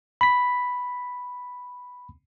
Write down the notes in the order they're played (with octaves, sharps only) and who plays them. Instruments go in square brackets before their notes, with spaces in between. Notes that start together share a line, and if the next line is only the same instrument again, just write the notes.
[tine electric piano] B5 B6